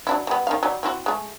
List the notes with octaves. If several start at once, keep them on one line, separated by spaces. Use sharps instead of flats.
F#3 D4 E4
G3 B3
D#3 F5
F#3 G3 D#4
C4 E4 F#4
G#3 A3